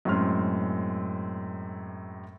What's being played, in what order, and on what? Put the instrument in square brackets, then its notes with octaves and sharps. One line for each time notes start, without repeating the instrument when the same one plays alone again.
[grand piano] F#2 A2 G#3 C4 C6 F6